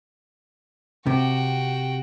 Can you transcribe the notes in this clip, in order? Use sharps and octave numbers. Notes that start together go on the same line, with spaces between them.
C3 F#4 G5